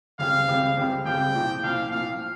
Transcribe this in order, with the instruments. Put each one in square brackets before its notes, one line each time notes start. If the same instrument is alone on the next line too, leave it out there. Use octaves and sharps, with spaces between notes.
[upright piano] C#2 C#3 G3 C4 [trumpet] F5
[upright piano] C#2 C#3 G3 C4
C#2 C#3 G3 C4
[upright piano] C#2 C#3 G3 C4 [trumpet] G5
[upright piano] C2 A#2 F3
[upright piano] C2 A#2 F3 [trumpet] F5
[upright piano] C2 A#2 F3 [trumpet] F5